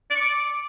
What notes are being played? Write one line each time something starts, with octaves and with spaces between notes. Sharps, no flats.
D5
C#6
D6